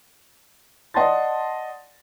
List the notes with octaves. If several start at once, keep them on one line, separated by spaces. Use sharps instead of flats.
D5 D#5 F#5 A5 C6 A6